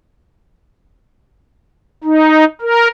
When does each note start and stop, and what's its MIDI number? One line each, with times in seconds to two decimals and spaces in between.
2.04 2.45 63
2.61 2.88 70